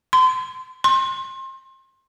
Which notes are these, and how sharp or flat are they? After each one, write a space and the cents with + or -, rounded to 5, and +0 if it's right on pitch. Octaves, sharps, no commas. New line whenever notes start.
C6 -35
C6 +30